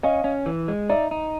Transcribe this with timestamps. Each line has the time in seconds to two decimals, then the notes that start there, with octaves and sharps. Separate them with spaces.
0.03 C#4 D#5 F5
0.24 C#4
0.46 E3
0.68 G#3
0.89 D#4 D5 E5
1.11 D#4